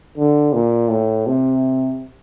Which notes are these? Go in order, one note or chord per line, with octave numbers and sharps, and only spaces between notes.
D3
A#2
A2
C3